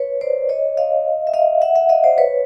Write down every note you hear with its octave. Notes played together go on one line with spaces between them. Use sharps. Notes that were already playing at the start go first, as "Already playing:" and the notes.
Already playing: B4 C#5
C5 D5
C#5 D#5
D#5 F5
E5
D#5 F5
E5 F#5
E5 F#5
D#5 F5
C5 D5
B4 C#5